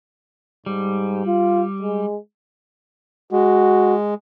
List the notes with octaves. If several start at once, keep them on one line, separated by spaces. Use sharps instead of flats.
G#2 G3
F4
G#3
G#3 F#4